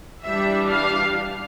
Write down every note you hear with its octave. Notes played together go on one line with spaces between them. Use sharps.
E3 G3 D4 E5
F5